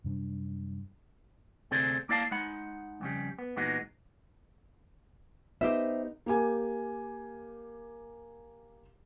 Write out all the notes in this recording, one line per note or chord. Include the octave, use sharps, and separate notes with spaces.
F#2 C3 G3 D4
D2 C3 C4 G#4 A4 D5
A#3 E4 D5 F5 A5
G#3 D#4 F#5 B5
F2 C#3 G3
B3
A#2 E3 G#3 B3 D#4 F#4
B3 D#4 G4 C5 E5
A#3 G4 G#5